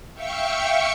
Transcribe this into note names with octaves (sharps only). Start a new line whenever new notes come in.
E5 F5 G5 C#6 C#7